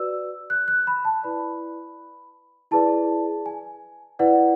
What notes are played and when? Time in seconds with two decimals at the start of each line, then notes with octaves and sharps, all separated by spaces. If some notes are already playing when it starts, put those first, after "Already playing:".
Already playing: F#4 B4 D5 E6
0.50 F#6
0.68 F#6
0.87 B5
1.05 A5
1.23 E4 B4 D5 B5
2.71 E4 G#4 B4 D5 A5
3.46 G#5
4.19 E4 B4 D5 F#5